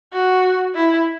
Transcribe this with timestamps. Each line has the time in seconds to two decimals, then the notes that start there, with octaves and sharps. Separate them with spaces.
0.13 F#4
0.75 E4